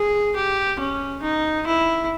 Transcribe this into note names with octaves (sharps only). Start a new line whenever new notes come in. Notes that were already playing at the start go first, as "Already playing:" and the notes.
Already playing: G#4
G4
C#4
D#4
E4